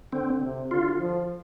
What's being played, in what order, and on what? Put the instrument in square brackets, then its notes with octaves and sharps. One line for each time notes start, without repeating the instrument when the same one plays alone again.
[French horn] D3 [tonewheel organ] C4
[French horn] C3
[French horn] D3 [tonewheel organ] F4
[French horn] F3